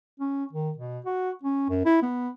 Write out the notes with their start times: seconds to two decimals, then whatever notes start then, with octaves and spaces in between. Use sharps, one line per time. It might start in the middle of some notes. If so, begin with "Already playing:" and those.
0.20 C#4
0.53 D#3
0.78 B2
1.06 F#4
1.43 C#4
1.69 F#2
1.85 E4
2.02 B3